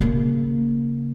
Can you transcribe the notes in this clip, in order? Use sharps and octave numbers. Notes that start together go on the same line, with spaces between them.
C#3 A#3